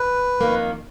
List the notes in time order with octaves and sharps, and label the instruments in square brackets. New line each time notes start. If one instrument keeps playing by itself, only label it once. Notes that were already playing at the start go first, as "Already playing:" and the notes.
Already playing: [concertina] B4
[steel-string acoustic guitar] F2 D#3 A#3